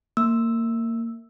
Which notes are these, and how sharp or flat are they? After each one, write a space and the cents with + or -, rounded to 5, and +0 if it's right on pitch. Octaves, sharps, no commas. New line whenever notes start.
A#3 -25 E6 +0